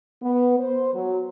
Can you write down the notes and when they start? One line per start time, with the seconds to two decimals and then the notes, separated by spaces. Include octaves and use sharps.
0.22 B3
0.60 C5
0.94 F#3